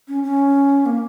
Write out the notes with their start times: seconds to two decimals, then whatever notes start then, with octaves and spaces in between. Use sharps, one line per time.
0.08 C#4
0.24 C#4
0.86 A#3